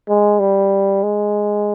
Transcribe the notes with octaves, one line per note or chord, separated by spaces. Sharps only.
G#3
G3
G#3